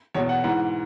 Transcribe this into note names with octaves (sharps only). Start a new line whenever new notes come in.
E2 B2 C#5
F#5
G#2 E3 F#5